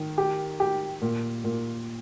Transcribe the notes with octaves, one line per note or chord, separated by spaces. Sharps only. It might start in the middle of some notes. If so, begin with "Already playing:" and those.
Already playing: D#3
G4
G4
A#2
A#2